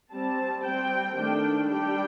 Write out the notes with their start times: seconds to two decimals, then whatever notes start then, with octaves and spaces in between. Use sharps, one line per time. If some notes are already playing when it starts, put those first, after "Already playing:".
0.12 G3 C4 A5
0.63 G3 C4 G5
1.16 D#3 A3 D4 G5
1.68 G3 D4 G5